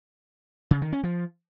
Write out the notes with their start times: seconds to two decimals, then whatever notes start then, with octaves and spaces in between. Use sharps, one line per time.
0.71 C#3
0.82 D#3
0.93 C#4
1.03 F3